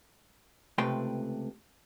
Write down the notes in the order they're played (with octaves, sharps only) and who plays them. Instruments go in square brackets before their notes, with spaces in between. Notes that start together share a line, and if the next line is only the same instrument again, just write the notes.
[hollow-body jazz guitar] C#2 C3 A3 B4 G5 C6